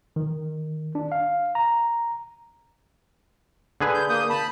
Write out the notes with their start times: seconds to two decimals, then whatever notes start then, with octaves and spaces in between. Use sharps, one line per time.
0.16 D#3
0.95 D4
1.12 F5
1.55 A#5
3.81 D3 G#4 B4
3.94 G6
4.09 A#3 D#6 G6
4.30 A5 B5